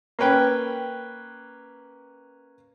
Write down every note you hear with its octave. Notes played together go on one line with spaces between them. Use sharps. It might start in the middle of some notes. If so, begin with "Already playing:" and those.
A#3 C#4 B4 G5